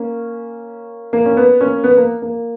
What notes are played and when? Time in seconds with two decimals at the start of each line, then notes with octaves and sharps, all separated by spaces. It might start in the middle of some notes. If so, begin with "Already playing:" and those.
Already playing: A#3 C#4
1.13 A#3
1.26 C#4
1.37 B3
1.60 A#3 C#4
1.84 B3
1.97 A#3
2.22 A#3